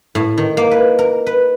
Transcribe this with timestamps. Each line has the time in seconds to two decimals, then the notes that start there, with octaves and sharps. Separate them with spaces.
0.15 A2
0.38 D#3
0.57 A#3
0.71 B4
0.99 A#4
1.26 B4